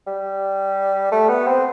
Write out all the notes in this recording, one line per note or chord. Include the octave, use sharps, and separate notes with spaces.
G3
A3
B3
C4